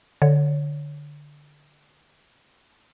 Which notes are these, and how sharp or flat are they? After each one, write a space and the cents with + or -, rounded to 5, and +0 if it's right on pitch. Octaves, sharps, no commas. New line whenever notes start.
D3 +0 C#5 +0